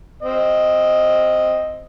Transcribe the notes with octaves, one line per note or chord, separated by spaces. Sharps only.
C4 D#5